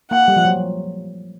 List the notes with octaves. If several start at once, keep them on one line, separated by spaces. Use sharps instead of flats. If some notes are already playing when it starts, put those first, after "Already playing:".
A#3 F#5
G3
F3
F#3